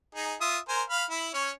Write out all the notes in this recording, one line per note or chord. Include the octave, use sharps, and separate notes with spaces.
D#4 G#4
F4 E5 D#6
A#4 C5 G#5
F5 B5
E4 B5
C#4 C#5